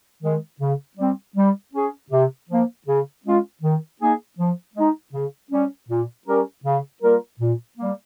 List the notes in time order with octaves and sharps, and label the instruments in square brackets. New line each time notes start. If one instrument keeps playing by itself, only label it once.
[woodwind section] D#3 G#3
C#3
G3 C4
G3
C#4 G#4
C3
F3 A#3
C#3
G#3 C#4 F4
D#3
A#3 D#4 G#4
F3
G#3 D#4
C#3
G3 C#4
A#2
G3 C#4 G4 A#4
C#3
G3 A#3 F4 A#4
A#2
G3 A#3